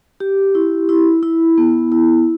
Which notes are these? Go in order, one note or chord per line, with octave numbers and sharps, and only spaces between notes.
G4
E4
E4
E4
B3
E4